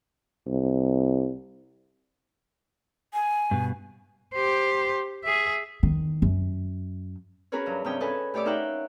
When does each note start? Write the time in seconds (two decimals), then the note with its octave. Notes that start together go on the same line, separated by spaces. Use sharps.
0.46 C2
3.14 G#5
3.51 G2 B2
4.34 G4 C5
5.24 G#4 E5
5.83 E2 D#3
6.22 F#2
7.52 C#4 F#4 G#4 A#4 B4 C#5
7.66 G2 F#3
7.84 G2 C3 C#4 C#5 G5 D#6
8.00 C#4 A4 B4 D#5 G#5
8.34 A2 G4 C#5 D5 D6 E6
8.45 D#4 F4 A#4 E5 F#5 G5